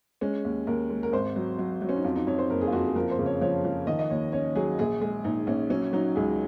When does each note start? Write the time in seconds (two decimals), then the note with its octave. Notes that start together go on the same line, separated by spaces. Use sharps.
0.21 G#3 C#4
0.45 D#2
0.67 D#2 A#4
0.90 G#3
1.03 A#4
1.13 G#1 C5
1.36 F#3
1.59 F#3
1.82 F#3
1.89 C#4
1.96 D#4
2.04 F2 F4
2.16 D#4
2.27 F2 C#5
2.39 C5
2.50 F#1 A#4
2.61 G#4
2.67 F4
2.72 F2 F#4
2.85 G#4
2.95 F3 A#4
3.11 C5
3.19 C#3
3.26 C#5
3.41 F3 C#5
3.65 F3
3.87 D#3 D#5
3.99 D#5
4.10 D#2 C#5
4.32 C#4 C#5
4.55 F#3 G#4
4.79 A#1 G#4
5.01 G#3 G#4
5.24 A#1 D#4
5.47 A#1 C#4
5.70 F#3 C#4
5.93 F#3 D#4
6.16 C#2 G#4